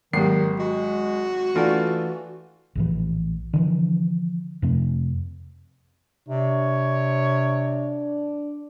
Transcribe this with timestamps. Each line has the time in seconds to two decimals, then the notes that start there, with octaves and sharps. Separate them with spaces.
0.13 G#1 D#3 F#3 A#3 G4 C7
0.59 G#3 F#4
1.55 E3 A3 D4 E4 F4 D5 F#5
2.75 A#1 A2 E3
3.53 D3 E3 F3
4.62 F2 C3 A3 C4
6.28 C3 D4 C#5